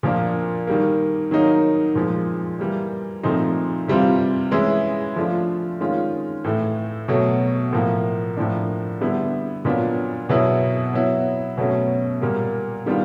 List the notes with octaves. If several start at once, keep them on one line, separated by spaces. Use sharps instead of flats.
A#2 F3 A#3 D4
D#3 G3 A#3
D#3 F#3 A#3 D#4
A#2 F3 G#3
E3 G3 A#3
A#2 F3 A3 C4 D#4
C3 E3 G3 C4 F4
E3 G#3 C#4 E4
F3 A3 D4 F4
D#3 G#3 C#4 F4
A2 E3 A3
B2 F#3 A3
A2 F3 A#3
A2 F3 A#3 D4
D3 G3 B3 E4
A#2 F#3 B3 D4 F4
B2 F#3 B3 E4
F#3 B3 E4
B2 F#3 A3 C#4
A#2 G3 A#3
D#3 G3 B3 D4 F4